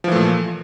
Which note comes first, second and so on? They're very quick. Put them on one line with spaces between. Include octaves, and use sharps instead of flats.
F3 E3 A3 A#2